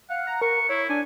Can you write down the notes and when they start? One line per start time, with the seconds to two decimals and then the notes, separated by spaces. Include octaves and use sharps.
0.10 F5 F#5
0.27 A#5
0.42 A#4 C#6
0.69 E4 C#5
0.89 D4 G#5